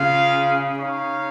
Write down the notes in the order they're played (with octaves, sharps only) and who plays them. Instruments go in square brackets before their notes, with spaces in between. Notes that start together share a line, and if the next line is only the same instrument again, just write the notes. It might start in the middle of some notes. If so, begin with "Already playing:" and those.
Already playing: [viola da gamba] C#3 [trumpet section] F4 G#4 F5
[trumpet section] D#4 C#5 F5